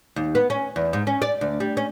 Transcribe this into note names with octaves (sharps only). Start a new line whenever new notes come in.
D#2
B3
C#4
E2
G#2
C#4
D5
D2
G3
C#4